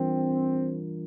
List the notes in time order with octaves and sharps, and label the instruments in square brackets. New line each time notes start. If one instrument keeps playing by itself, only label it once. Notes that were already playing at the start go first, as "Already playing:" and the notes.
Already playing: [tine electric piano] E3 G3 D4 F4 A#4 [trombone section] C4